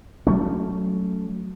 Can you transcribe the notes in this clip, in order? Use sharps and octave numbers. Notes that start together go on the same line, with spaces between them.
F#3 A3 C#4